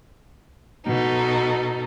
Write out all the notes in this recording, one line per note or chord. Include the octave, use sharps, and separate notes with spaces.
B2 D#4 A4